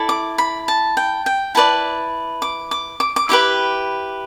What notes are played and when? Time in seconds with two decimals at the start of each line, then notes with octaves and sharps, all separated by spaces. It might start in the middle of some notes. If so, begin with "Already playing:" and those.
Already playing: E4 A4 D5
0.09 D6
0.38 B5
0.68 A5
0.97 G5
1.26 G5
1.55 E4 B4 D5 A5
2.42 D6
2.71 D6
3.00 D6
3.16 D6
3.29 E4 G4 B4 D6